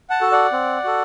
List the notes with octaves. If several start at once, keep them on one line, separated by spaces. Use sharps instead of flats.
F#5 A5
F#4 A4
D5 F#5
C4
F#4 A4